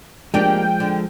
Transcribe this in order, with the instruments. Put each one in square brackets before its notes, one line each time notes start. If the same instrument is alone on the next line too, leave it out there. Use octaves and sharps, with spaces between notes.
[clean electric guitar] F3 G#3 [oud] A#3 D4 G4 [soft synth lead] G5
[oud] D3